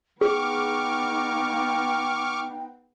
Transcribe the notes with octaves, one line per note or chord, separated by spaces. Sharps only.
B3 D#4 G#4 G5 C#6 D6 F6